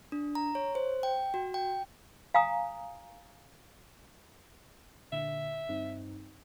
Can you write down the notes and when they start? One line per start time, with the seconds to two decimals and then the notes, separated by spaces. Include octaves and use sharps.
0.12 D4
0.35 A#5
0.55 C#5
0.75 C5
1.03 G5
1.34 F#4
1.54 G5
2.34 F5 G#5 A#5 D#6
5.12 A#2 D3 E5
5.69 G2 C4 D#4